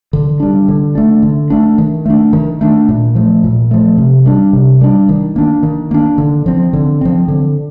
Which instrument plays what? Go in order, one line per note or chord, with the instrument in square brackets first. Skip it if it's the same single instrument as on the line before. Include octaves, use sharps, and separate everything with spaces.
[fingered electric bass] D3
G3 D4
D3
A3 D4
D3
A3 D4
D#3
A3 D4
D#3
A3 D4
A#2
F3 A3
A#2
F3 A3
C3
G3 D4
C3
G3 D4
D#3
A#3 D4
D#3
A#3 D4
D3
F3 C4
D3
F3 C4
D3